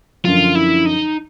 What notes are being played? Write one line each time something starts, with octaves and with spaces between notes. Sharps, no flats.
F#2 D3 F3 F4
E4
D#4